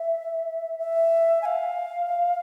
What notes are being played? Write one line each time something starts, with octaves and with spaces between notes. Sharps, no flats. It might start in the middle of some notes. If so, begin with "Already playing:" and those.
Already playing: E5
E5
G#5
F5